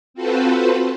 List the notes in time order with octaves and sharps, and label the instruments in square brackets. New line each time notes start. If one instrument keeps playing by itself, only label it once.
[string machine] C4 F4 F#4 A4 B4 C5